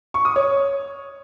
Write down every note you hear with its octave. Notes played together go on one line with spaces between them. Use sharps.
C#6
D#6
C#5